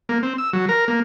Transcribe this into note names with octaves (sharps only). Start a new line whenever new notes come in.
A#3
C4
E6
F#3
A#4
A#3